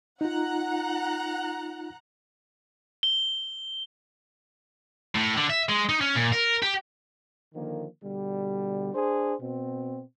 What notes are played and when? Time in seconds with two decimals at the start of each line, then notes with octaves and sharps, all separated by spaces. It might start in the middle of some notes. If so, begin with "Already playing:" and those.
0.21 D#4 F4 F#5 A#5 F#6
3.03 G7
5.15 A2
5.37 D3
5.50 E5
5.69 G#3
5.89 D#4
6.01 C#4
6.16 A#2
6.33 A#4
6.63 G4
7.54 D3 D#3 F3 A#3
8.02 B2 D3 G3
8.93 D4 G#4 C5
9.41 B2 C4